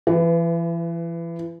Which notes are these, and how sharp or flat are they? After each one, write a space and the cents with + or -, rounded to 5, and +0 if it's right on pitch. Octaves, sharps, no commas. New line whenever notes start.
E3 +35 B4 +20